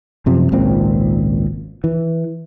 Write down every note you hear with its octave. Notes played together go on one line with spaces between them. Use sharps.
F#2 C3 F3
G#1 C#2 A#2 C4
E3